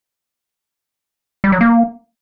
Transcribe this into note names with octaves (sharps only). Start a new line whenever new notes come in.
G3
F#3
A#3